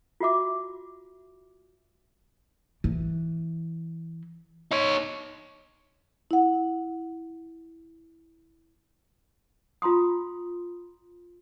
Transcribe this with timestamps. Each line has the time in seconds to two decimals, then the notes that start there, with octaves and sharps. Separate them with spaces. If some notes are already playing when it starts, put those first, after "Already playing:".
0.20 F4 F#4 E5 D6
2.84 E3
4.71 D#4 C#5
6.31 E4 F#5
9.82 F4 A#5 C6 D#6